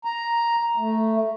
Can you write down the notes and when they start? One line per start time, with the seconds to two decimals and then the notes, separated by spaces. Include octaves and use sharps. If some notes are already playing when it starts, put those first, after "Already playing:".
0.05 A#5
0.77 A3